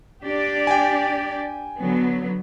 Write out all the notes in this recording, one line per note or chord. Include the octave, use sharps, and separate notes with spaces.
D4 G4 D5
G5 G#5
D3 F#3 B3